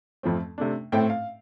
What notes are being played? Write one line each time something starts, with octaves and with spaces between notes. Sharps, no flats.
F2 F3 A3 C4
C3 A3 D4
A2 A3 C4 G5
F5